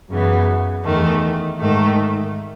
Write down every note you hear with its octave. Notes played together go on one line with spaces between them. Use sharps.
F#2 C#3 E3 B3
E2 D#3 A3
G#2 D#3 A3